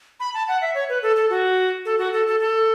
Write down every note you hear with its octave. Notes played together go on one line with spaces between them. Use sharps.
B5
A5
F#5
E5
C#5
B4
A4
A4
F#4
A4
F#4
A4
A4
A4